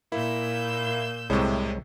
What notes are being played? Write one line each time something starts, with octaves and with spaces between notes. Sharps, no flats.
A#2 A#3 E4 E6 G6
C2 A2 C3 G#3 C#5